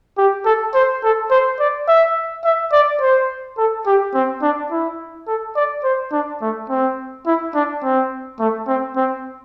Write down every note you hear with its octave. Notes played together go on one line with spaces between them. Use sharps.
G4
A4
C5
A4
C5
D5
E5
E5
D5
C5
A4
G4
C4
D4
E4
A4
D5
C5
D4
A3
C4
E4
D4
C4
A3
C4
C4